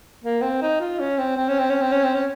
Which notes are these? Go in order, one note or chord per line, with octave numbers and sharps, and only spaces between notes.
A#3
C4
D#4
F4
C#4
C4
C4
C#4
C4
C#4
C4
C#4
C4
C#4